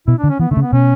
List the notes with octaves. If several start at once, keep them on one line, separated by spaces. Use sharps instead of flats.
B2 E4
D4
D3
C#4
E3 B3
D3 A3
C#3
B3
B2 C#4